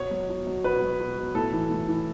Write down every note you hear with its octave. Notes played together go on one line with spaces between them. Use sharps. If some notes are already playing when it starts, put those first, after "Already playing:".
Already playing: B2 C#5
F#3
B2
F#3
B2 B4
F#3
B2
F#3
A2 A4
E3
A2
E3